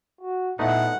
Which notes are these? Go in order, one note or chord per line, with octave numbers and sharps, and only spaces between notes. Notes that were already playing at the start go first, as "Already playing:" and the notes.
F#4
A#2 A3 B3 D#4 E4 F#5